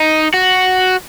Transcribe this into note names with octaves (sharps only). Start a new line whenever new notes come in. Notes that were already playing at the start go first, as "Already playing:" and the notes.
Already playing: D#4
F#4